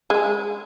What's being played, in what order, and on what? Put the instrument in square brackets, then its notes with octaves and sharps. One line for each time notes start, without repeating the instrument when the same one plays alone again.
[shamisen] G#3